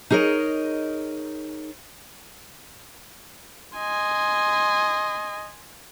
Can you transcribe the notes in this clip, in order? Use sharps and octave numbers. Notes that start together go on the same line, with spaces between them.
D#4 G#4 A#4 C#5 D#5
D#5 G#5 C6